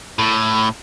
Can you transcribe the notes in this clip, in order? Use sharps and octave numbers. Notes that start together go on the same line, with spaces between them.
A2